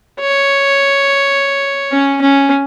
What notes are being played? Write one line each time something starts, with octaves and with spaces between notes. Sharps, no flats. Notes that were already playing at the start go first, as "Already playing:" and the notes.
C#5
C#4
C#4